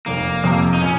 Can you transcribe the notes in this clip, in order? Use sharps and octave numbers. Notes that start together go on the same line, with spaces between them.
F1 A#3
F2 C3
D#4
A#2 C#4